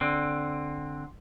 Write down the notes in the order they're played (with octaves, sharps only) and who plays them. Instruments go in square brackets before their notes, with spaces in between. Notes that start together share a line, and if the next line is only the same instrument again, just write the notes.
[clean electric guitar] D3 C4